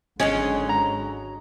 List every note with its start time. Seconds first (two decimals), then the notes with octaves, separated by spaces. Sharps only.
0.20 G#1 D3 F#3 G#3 C#4 C#5 D#5
0.69 A#5